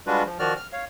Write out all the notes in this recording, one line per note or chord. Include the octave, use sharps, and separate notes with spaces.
G3 G#3 D4 F4 F#4 B4
F3
D#3 F3 F#4 D5 F6
F6
C#5 F5